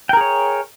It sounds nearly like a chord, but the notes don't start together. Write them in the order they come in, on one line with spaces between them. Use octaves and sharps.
G5 A#4 G#4 C#5